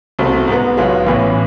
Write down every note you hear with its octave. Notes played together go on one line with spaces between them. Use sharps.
C2 B2 A3 C4
G#2 G#3 B3
B1 B2 G#3 B3 F4
A1 A2 E3 B3